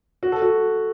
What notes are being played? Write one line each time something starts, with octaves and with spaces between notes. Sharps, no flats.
F#4
A4
F#4